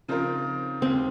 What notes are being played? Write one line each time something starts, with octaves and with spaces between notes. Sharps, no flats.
C#3 F3 C4 D#4 F4 A#4
D#2 C#3 G#3 C4